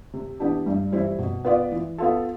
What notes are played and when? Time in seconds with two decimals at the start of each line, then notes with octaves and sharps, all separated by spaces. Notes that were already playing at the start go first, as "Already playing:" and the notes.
0.13 C3
0.40 E3 B3 D4 G4
0.66 G2
0.92 E3 G3 C4 E4
1.18 B2
1.45 B3 F4 B4 D5
1.72 E3
1.98 B3 F4 A4